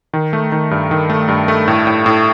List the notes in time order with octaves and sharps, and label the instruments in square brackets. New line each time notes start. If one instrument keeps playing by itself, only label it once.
[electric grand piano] D#3
A3
D#3
G2
D#3
A3
G2
A3
A2
A2
A2